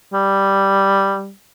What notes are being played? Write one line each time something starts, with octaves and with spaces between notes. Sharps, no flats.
G3